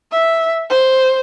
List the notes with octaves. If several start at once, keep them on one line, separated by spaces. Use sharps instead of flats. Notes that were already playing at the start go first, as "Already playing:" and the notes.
E5
C5